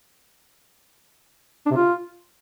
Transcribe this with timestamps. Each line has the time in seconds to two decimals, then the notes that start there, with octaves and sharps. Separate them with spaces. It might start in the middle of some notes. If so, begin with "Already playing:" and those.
1.66 D4
1.71 C3
1.76 F4